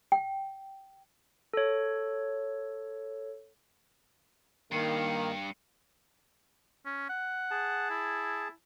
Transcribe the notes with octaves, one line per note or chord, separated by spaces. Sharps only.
G5
A4 C#5
G2 D#3 A#3 C7 C#7 D#7
C#4
F#5
G#4 A5
E4